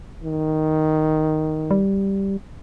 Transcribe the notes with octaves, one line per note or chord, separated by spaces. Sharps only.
D#3
G3